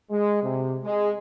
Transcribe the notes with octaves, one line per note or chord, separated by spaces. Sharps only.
G#3
C3
G#3